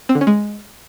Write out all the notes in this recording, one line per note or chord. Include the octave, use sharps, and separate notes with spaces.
C4
D3
C#4
G#3